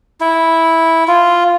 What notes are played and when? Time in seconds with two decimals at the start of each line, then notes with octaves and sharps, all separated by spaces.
0.21 E4
1.08 F4